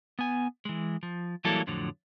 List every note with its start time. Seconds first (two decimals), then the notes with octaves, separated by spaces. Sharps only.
0.19 B3 G#5
0.65 E3 G#3
1.03 F3
1.45 E3 F#3 G3 A#3 E4 A4
1.67 F2 A2 D3 F3 F#3